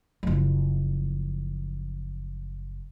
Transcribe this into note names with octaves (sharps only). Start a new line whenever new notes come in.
F#1 F3